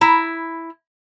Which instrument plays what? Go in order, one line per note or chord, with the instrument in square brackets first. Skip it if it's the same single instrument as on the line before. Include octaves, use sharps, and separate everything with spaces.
[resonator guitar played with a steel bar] E4 A#5